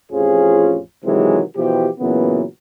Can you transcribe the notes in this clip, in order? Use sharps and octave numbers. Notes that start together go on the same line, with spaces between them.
A1 F2 F3 C#4 F4 G#4
C3 D#3 E3 F#3 G#3 C4
B2 E3 F3 G4
A#2 C#3 E3 F#3 B3